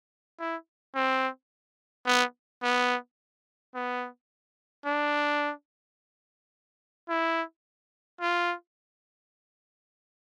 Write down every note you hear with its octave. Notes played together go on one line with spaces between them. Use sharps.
E4
C4
B3
B3
B3
D4
E4
F4